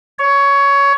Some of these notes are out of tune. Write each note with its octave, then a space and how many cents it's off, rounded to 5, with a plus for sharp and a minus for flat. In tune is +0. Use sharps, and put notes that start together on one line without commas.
C#5 +15